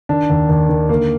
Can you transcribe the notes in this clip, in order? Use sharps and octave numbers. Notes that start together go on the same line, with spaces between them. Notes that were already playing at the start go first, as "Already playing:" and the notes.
D#3 D4
D#2
D#2
D#3
D3 A#3